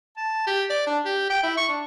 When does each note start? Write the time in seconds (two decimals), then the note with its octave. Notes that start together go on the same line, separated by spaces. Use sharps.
0.17 A5
0.47 G4
0.70 D5
0.87 D4
1.05 G4
1.30 G5
1.43 E4
1.57 C#6
1.69 D4